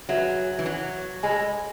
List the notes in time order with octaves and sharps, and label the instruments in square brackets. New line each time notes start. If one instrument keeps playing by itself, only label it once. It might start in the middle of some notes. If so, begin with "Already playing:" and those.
[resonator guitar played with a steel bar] F#3 [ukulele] G#4 B4 E5 G#5
[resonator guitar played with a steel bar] E3
F#3
[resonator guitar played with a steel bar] G#3 [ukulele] A4 C#5 G#5 B5